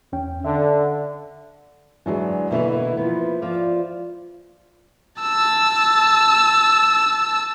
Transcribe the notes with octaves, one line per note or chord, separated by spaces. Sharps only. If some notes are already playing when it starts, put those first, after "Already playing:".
E2 C#4 G5
D3 E5
D2 E3 F#3 G#3 D4
B2 D3 E3 A#3 E4 B4
F3 B3
F3 F4 D5
A5 E6